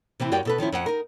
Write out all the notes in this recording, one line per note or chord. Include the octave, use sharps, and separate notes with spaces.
C3 E3 C4 E4
F#2 F#4 G4 D5 G5
B2 A4 B4
D#3 F3 C#4 E4
F2 F#5
D#4 A#4